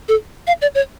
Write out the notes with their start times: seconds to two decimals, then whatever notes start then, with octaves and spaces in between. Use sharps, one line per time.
0.09 A4
0.47 F5
0.62 D5
0.75 C#5